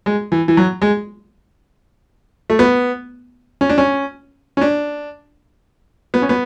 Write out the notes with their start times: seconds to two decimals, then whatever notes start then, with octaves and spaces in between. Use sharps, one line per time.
0.06 G#3
0.32 E3
0.48 E3
0.57 F#3
0.82 G#3
2.50 A3
2.59 B3
3.61 C#4
3.69 D4
3.78 C#4
4.57 C#4
4.61 D4
6.14 B3
6.22 C#4
6.29 B3